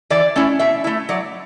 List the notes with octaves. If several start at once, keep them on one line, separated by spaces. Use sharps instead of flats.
E3 D5
A3 C#4 E4
B2 E5
A3 E4
F#3 D5